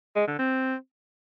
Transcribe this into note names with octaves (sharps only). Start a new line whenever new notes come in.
G#3
D3
C4